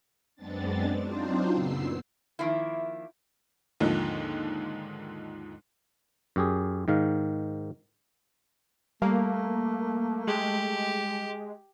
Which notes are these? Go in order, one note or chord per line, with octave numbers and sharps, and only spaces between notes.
F#2 G#3 B3 C4 D4 A6
F#3 C4 D4 D#4 F4 C5
F#2 A#2 C#3 B3 E6 C7
D#3 F3 A#3 E4
D#2 G#2 D3 D#3 F3 G#3
F#2 G4 G#4
G#2 D#3 F5
G3 A3 A#3
G#3 G4